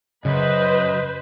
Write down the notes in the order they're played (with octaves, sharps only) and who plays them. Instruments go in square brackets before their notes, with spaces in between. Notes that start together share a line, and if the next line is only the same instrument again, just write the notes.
[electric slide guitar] F#2 [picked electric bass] C#3 [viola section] B4 C5 [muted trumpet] D#5